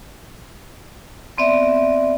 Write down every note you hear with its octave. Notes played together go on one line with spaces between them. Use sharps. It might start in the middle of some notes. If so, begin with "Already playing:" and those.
B3 C4 D5 E5